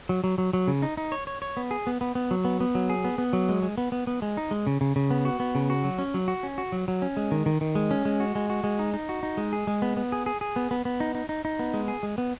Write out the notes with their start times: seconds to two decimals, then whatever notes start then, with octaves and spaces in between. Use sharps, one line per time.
0.09 F#3
0.24 F#3
0.38 F#3
0.53 F#3
0.68 C#3
0.82 D#4
0.97 D#4
1.12 C#5
1.27 C#5
1.42 C#5
1.57 B3
1.71 G#4
1.87 B3
2.01 B3
2.15 B3
2.31 F#3
2.45 B3
2.60 B3
2.75 F#3
2.89 G#4
3.04 B3
3.18 B3
3.33 F#3
3.49 G#3
3.62 G#3
3.78 B3
3.92 B3
4.07 B3
4.22 G#3
4.37 D#4
4.51 G#3
4.67 C#3
4.81 C#3
4.96 C#3
5.11 B3
5.25 F#4
5.40 B3
5.55 C#3
5.70 F#4
5.84 F#3
5.98 C#4
6.14 F#3
6.28 F#4
6.43 C#4
6.58 F#4
6.72 F#3
6.88 F#3
7.02 C#4
7.17 G#3
7.31 D#3
7.46 D#3
7.61 D#3
7.75 G#3
7.91 C#4
8.05 G#3
8.20 F#4
8.35 G#3
8.50 F#4
8.64 G#3
8.79 D#4
8.94 D#4
9.09 F#4
9.23 D#4
9.37 G#3
9.53 G#4
9.67 G#3
9.82 B3
9.97 B3
10.12 G#4
10.26 G#4
10.41 G#4
10.56 B3
10.71 B3
10.85 B3
11.00 D#4
11.15 D#4
11.29 D#4
11.45 D#4
11.59 B3
11.74 G#3
11.88 G#4
12.03 G#3
12.18 B3